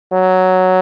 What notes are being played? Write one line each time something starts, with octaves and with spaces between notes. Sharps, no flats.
F#3